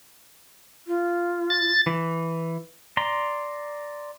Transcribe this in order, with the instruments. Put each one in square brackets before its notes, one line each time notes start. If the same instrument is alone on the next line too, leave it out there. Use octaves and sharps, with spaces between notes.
[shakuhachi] F4
[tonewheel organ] A6
[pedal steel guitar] E3
D5 A#5 C6